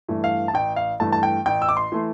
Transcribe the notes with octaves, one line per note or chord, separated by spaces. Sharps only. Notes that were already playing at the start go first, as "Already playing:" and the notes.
G2 E3 A3
F5
A5
A1 G5
F5
G2 E3 A3 A5
A5
G5
A1 G5
E6
D6
C6
E3 A3